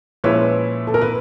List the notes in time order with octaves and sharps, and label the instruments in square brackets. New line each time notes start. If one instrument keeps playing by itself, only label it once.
[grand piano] A#2 F3 G#3 C#4 E4 [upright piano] B4 C#5
[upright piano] A4
A#4
B4